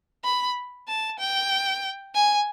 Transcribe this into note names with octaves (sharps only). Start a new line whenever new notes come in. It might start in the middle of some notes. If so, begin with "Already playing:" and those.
B5
A5
G5
G#5